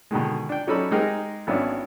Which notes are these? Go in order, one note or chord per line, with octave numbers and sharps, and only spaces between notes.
B2 D3 D#3 G#3
D4 G5
F#3 C#4 D#4 A4 D5 B5
G#3 C4 D#4 G4 G#4 A#4
G#1 B3 C#4 D4 E4